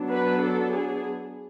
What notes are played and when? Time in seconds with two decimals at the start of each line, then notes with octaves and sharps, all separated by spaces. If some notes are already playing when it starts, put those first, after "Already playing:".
Already playing: F#3 B3 D4
0.10 B4
0.42 A4
0.72 G#4